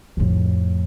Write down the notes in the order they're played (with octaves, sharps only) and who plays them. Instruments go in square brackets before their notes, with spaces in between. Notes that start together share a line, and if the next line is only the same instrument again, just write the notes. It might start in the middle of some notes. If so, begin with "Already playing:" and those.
[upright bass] F2 A2